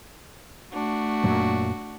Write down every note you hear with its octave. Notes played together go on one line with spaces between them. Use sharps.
A3 D4 F#4
F#2 A#2 F#3